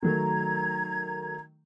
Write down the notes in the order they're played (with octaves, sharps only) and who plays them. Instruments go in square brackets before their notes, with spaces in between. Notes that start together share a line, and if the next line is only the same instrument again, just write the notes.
[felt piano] D#3 F#3 A3 [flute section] A#5 G#6